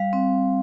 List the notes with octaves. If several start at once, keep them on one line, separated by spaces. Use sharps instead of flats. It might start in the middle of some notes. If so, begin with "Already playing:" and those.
Already playing: G3 F5
C4